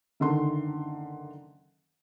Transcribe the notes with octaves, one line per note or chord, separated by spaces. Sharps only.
F#1 D3 D#3 C6